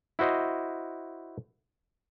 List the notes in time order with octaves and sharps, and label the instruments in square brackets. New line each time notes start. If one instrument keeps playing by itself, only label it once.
[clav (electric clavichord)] E4 F#4 C5 D#5